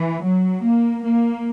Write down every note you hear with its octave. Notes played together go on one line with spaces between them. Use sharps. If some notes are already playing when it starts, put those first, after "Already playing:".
Already playing: E3
F#3
A#3
A#3